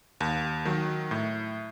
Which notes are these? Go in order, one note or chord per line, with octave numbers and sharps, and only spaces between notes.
D#2
D#3 F#3
A2